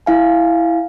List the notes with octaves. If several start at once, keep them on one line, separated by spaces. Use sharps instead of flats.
E4 F5 G#5